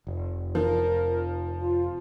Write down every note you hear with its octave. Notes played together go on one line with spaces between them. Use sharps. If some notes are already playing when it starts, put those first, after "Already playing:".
F1
F3 A#4
F4